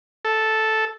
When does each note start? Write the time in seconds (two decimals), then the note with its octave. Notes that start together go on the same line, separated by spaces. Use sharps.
0.25 A4